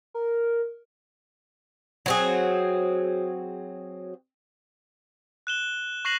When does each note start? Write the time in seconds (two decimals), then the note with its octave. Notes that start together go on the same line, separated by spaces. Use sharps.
0.14 A#4
2.06 F#3 C4 G#4
5.47 F#6 E7 G7
6.05 C#6 F#6 A#6 C7 E7 F#7